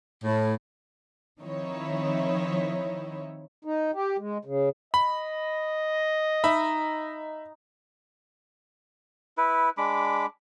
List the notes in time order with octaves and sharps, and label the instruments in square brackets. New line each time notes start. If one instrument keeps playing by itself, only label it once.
[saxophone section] A2
[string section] D#3 F3 C4 D#4 E4 C#5
[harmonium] D#4
G4
G#3
C#3
[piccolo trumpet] D#5 [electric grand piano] B5
[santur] D#4 [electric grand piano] E5 B5
[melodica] E4 B4
G#3 D4 B5 D6